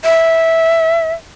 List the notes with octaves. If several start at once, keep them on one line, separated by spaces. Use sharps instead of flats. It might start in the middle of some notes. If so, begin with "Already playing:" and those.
E5